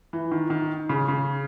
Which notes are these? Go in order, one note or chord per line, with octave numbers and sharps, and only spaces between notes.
E3
D#3
D#3
C#3
C#3